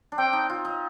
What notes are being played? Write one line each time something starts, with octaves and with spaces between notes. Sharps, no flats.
D4
C4 G5
D#4
F4
D#4